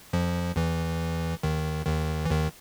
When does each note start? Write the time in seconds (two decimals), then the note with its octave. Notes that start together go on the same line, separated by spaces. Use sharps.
0.13 F2 F3
0.56 E2 E3
1.43 D#2 D#3
1.86 D#2 D#3
2.26 E3
2.31 D#2 D#3